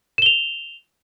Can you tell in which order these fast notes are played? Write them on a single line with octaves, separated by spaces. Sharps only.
E7 G7 F7